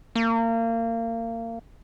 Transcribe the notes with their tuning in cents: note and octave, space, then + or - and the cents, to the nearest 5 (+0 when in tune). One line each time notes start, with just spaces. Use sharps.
A#3 -30